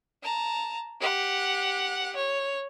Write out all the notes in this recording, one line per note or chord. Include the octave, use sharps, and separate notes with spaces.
A5 A#5
G4 F#5
C#5